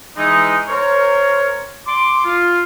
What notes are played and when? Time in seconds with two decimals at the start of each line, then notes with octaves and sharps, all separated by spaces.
0.16 E3 G#3 D#4
0.68 A#4 C5 C#5
1.87 C6 D6
2.24 F4